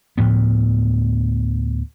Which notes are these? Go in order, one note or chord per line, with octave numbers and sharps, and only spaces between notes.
D2 A2 F3 B3